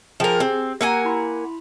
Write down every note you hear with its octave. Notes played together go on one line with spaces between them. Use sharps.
F3 G#4 A#4 G5 G#5
C4 G4
A#3 G4 F#5 G#5 A#5 E6
E4 B5 C6